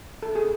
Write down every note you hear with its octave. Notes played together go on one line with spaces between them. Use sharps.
A4
G#4